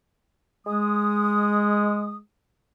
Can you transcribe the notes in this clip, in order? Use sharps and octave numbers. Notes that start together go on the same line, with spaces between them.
G#3 D#6